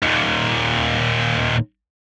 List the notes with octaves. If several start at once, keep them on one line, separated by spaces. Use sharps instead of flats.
D#2 A#2